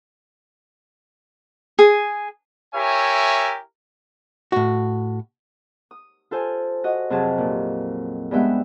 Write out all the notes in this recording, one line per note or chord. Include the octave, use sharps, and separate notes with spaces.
G#4
E4 G4 A#4 C#5 E5 G#5
A2 F#4
D#6
F4 A4 C5 G#5
F#4 D#5
F2 C3 F#3 F4 G#4 A5
A#2
G2 G#3 B3 E5 G5